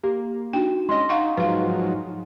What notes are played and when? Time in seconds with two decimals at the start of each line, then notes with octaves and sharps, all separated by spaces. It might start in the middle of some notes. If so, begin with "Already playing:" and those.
0.03 A#3 G4
0.53 D4 D#4 F#4 G5
0.89 G#3 C#4 D#5 C6
1.09 D#4 F5 F#5 C#6
1.37 G#2 F3 F#3 B4 F5 C6